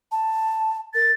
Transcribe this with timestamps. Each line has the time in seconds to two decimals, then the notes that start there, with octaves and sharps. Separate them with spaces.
0.12 A5
0.95 A#4 A6